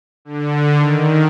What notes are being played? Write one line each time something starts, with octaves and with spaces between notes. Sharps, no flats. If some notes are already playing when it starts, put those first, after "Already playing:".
D3
D#3